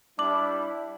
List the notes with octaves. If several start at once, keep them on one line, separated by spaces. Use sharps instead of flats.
G3 D4 E4 D6 F#7